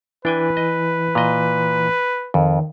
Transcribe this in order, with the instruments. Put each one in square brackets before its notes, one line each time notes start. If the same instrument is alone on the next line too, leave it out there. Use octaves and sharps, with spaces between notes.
[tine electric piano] E3 [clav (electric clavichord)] D4 G5 G#5 [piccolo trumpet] B4
[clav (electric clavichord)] D#5
A#2 D#5
[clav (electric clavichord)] F2 [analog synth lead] D#3